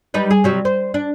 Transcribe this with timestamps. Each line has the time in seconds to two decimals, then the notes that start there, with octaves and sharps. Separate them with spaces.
0.14 G3 D#4 B4
0.31 G#4
0.44 C3 F#3 G3
0.65 C5
0.94 D4